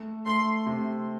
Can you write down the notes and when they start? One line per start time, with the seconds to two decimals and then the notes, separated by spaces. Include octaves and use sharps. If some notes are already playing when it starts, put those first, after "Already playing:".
Already playing: A3
0.26 A3 C6
0.66 C3